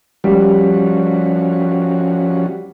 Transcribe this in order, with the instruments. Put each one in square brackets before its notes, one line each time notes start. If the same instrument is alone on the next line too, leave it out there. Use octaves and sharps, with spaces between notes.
[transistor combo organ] F3 C#4 F#4 [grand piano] G3